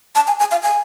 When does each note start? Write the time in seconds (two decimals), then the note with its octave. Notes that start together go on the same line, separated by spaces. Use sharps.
0.15 A5
0.27 G#5
0.40 G#5
0.51 F5
0.63 G#5